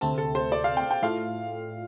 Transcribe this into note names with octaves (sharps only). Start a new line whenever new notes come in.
D2 C3 A3 C4 A5
A4
C5
D5
F5
G5
G5
A2 A3 F4 F5